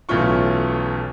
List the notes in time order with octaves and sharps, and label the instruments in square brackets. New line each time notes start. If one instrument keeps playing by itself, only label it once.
[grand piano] B1 E3 A3 C#4 F4 C#6